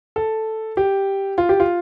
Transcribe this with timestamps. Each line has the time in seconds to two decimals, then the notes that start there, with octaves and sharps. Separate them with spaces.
0.16 A4
0.77 G4
1.38 F4
1.49 G4
1.60 F4